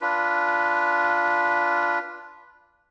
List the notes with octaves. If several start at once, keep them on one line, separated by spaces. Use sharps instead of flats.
D4 F4 B4